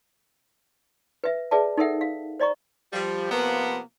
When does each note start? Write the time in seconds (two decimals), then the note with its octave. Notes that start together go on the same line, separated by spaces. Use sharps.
1.24 B4 E5
1.51 G#4 B4 D5 E5 A5
1.77 D#4 A4 A#4 E5 F#5
2.01 F5
2.40 C5 D5 D#5 A#5 C#6
2.93 F3 G3
3.32 C3 F3 A#3 B3